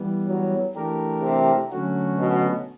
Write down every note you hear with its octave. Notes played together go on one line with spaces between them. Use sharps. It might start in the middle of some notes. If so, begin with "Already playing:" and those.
Already playing: E3 G3 B3
F#3
E3 A3 D4 G4 A#4
C3
D3 F#3 A3 C#4 F#4
B2